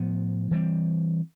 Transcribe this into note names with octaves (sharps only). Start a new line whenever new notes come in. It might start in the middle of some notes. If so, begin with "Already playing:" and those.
Already playing: A2 F3 B3
E3 G3 C4